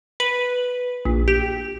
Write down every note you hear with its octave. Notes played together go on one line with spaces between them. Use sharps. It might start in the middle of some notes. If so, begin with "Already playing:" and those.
B4
A#1
G4